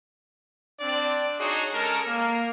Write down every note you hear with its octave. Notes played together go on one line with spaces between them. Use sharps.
C4 D4 D5
D4 D#4 F#4 G#4 C#5 D#5
G#3 C#4 A4 A#4
A#3